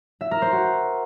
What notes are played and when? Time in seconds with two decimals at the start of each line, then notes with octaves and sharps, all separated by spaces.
0.21 E5
0.31 A#4
0.42 C5
0.52 F#4